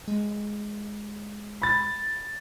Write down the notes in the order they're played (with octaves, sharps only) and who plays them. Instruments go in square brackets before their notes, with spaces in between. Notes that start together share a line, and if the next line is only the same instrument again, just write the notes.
[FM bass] G#3
[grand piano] B5 A6